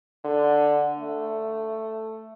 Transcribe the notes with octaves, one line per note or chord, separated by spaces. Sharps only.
D3
A3